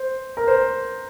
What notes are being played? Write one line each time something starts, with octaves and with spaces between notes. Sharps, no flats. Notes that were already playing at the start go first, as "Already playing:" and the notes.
Already playing: C5
A#4
C5